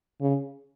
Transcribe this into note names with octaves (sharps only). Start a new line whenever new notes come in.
C#3